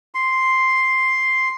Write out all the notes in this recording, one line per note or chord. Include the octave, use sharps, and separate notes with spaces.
C6